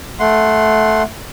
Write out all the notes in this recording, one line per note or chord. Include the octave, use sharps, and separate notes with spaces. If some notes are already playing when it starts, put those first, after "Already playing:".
A3 F#5 C6